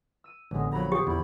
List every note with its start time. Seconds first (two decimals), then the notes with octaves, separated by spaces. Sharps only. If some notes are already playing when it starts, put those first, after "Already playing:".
0.24 E6 D#7
0.51 A1 D3 G#3 B3
0.72 A#1 A#2 F#3 A#5 B5
0.92 G4 G#4 C5 G5
1.07 E2 B5